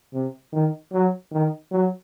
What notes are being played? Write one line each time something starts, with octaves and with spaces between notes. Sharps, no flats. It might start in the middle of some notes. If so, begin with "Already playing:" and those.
C3
D#3
F#3
D#3
F#3